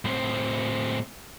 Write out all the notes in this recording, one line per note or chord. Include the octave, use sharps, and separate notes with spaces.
A2 C4